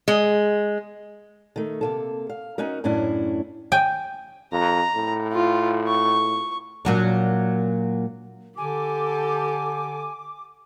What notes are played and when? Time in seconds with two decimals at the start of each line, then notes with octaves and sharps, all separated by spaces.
0.08 G#3
1.56 D#3 A3
1.81 C3 A#3 A4
2.29 F5
2.58 C#4 D#4 F#4 A#4
2.84 F#2 A2 C#4 D4 E4
3.72 G5 G#5
4.52 F2 A#5
4.96 A2
5.32 F4
5.88 C#6
6.85 A#2 F#3 D4
8.58 D3 G4 A4 G#5 D6